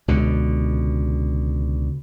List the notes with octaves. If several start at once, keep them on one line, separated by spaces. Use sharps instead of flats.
C#2 B2 D3